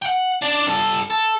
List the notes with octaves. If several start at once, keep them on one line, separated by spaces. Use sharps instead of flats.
F#5 G5
D4 D5
G2 A4
A4